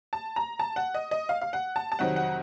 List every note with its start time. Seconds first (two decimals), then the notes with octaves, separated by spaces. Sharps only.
0.13 A5
0.36 A#5
0.59 A5
0.76 F#5
0.94 D#5
1.11 D#5
1.29 F5
1.41 F5
1.53 F#5
1.76 A5
1.92 A5
1.99 F2 C3 D#3 F#3 C4 F#5
2.16 F#5